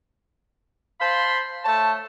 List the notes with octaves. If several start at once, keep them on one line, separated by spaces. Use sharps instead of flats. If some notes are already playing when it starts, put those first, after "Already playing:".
C5 F5 A5 B5 C6
A3 C#5 A5